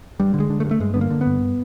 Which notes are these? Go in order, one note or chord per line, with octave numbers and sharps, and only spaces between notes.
G2 G3
D3
G#3
D3
A3
G2
A3
G2 G#3
D3 B3
A#3
D3
B3
G2